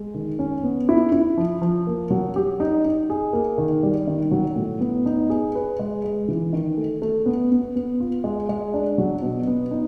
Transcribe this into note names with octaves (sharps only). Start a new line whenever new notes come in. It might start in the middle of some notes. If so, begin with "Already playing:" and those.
Already playing: G#3
D#3
C#4
B3
E4
E4
F3
F3
A#3
F#3
G4
D#4
D#4
G#4
A#3
D#3
G3
D#3
F#3
A2
B3
D#4
G#4
B4
G#3
G#3
E3
D#3
A3
A3
B3
B3
B3
F4
G#3
G#3
D4
F#3
B2
B3
D#4